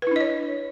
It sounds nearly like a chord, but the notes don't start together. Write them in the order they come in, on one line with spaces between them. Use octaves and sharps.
B4 E4 D4 D#5 C#5